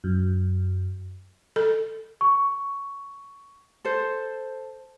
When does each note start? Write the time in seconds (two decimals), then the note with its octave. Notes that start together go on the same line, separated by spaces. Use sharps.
0.04 F#2
1.56 A4
2.21 C#6
3.85 A4 C5